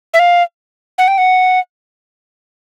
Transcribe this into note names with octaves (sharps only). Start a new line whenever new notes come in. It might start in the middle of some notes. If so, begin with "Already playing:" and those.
E5
F5
F#5
G5
F#5